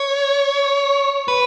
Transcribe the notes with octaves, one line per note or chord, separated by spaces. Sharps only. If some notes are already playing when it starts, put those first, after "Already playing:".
Already playing: C#5
B4